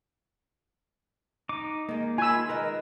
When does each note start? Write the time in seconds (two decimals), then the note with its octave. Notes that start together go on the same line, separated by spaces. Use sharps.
1.49 D#4 D6
1.89 D#3 G#3 A#3
2.18 F4 G#5 B5 E6
2.49 D#3 G#3 A#4 B4